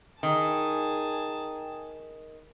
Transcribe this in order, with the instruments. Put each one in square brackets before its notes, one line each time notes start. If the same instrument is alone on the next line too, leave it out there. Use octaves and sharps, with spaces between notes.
[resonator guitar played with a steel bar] D#3 [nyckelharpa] G#4 A5 [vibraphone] G5 A#5